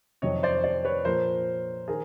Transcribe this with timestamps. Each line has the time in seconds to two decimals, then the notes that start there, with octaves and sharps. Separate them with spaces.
0.22 F2 C3 D#3 F#3 C#5 D#5
0.43 C5 D5
0.64 C5 D5
0.85 B4 C#5
1.05 A#2 F3 A#4 C5
1.88 D#3 G#4 A#4